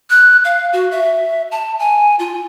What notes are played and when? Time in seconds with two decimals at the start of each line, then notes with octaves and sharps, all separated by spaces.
0.10 F#6
0.44 F5
0.73 F#4
0.91 E5
1.51 A5
1.79 G#5
2.19 F4